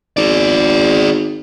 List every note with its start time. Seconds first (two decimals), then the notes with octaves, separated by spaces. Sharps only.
0.17 G#1 G#4 D5